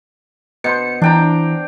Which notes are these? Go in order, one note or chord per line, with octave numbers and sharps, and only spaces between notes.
B2 C5 C#7
E3 D4 G5 A#5